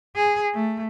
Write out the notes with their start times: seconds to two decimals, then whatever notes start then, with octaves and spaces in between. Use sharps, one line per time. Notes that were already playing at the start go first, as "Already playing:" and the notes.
0.16 G#4
0.54 A3